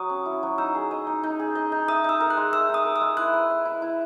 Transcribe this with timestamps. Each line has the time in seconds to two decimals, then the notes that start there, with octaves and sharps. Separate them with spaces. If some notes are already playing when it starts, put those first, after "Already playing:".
Already playing: F#3 D#6
0.10 C#4
0.26 E4
0.43 F#3
0.58 D#4 E6
0.75 G#4
0.91 D#5
1.07 D#4
1.23 D#4
1.40 G#4
1.55 D#5
1.72 D#4
1.88 E5 D#6
2.04 D#4 E6
2.20 A#4
2.30 F#6
2.37 G#3
2.53 E5 E6
2.69 D#4
2.74 D#6
2.85 A#4
2.96 E6
3.01 G#3
3.17 E4 F#6
3.34 B4
3.50 E5
3.65 E4
3.82 E4